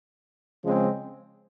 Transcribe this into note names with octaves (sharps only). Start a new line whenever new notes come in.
C#3 F3 G#3 C4